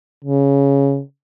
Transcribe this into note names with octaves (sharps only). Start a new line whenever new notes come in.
C#3